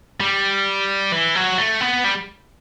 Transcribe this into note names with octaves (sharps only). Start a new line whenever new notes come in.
G3
E3
F#3
A3
B3
G3